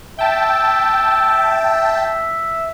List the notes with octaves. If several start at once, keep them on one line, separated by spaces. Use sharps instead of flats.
E5 G5 A5